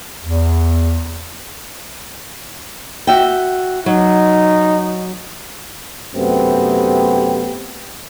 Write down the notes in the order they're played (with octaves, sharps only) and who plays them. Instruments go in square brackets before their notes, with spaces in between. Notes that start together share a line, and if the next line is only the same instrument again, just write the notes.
[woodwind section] E2
[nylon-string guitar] F#4 E5 G5
[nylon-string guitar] F#3 [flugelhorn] D#4
[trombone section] F#2 C3 A3 B3 C4 G4